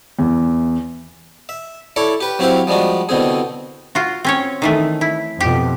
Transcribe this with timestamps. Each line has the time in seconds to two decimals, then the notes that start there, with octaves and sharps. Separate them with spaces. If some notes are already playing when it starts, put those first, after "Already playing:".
0.19 E2
1.49 E5
1.96 E4 A4 C#5 D5
2.21 G4 B4
2.39 F#3 C4 E4 G4 C5 F5
2.67 F3 G3 G#3 D4 F#4
3.09 C2 B2 D3 C4 G#4
3.95 F4 F#4
4.25 C4 C#4 C#5
4.62 D#3 E3 A3
5.01 E4
5.41 F2 B2 G4